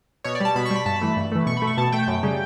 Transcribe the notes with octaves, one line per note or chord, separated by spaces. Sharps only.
B2 C#5
D5
G3 A5
B2 B5
C#6
G3
B5
G2 A5
B5
E3 A3
G2
E3 A3
B2 C#6
B5
A3
C#6
B2 A5
A3 G5
F#2
C#3 G3